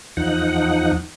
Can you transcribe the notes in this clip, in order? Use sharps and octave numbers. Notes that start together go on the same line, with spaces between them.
E2 F3 D#4 F#5